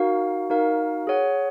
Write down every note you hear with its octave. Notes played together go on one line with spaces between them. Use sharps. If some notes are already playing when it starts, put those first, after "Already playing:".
Already playing: D#4 F#4 A#4 F5
D#4 F#4 A#4 F5
G#4 C#5 F#5